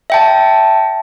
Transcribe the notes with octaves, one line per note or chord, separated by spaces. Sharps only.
E5 G5 A5